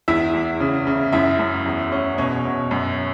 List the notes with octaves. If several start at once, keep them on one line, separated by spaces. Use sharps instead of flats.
E2 E4 E5
E2
C#3
C#3
F#2 E4 E5
F#2
E2
C#4
B2 C#4 C#5
B2
F#2